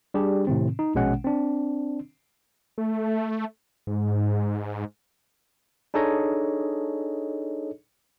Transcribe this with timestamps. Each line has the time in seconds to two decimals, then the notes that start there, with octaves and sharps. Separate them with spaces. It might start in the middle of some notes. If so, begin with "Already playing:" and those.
0.14 G3 D4 G4 G#4
0.47 A2 C3 D#3 C4
0.79 D#4
0.95 A#1 B2 G#3 C#4 F#5
1.24 C4 D4
2.78 A3
3.87 G#2
5.94 D4 D#4 G#4 A4 C#5 D#5